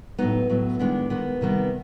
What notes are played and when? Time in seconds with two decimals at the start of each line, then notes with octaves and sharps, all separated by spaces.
0.18 A2 F#3 B3 D#4
0.49 A2 F#3 B3
0.79 D#3 G#3 B3 D4
1.10 D#3 G#3 B3
1.41 C3 D#3 G3 B3